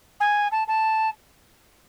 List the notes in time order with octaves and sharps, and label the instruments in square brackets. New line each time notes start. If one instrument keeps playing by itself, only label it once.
[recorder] G#5
A5
A5